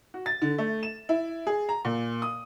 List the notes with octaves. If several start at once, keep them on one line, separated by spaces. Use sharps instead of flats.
F#4
A6
D3
A3
E7
E4
G#4
A#5
A#2
D#6